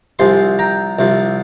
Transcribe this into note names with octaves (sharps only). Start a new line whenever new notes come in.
C2 C3 F3 G#5 C6
G5 A#5
C2 C3 F3